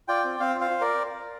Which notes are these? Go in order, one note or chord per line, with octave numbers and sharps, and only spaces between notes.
F4 D5 G5
C4
C4 C5 F5
F4
C5 F5
F4
A#4 D5